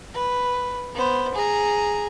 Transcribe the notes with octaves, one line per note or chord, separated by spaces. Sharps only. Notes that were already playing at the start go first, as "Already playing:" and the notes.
B4
B3 C5
G#4 A#5